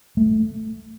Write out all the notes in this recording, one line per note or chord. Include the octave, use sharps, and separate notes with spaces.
A3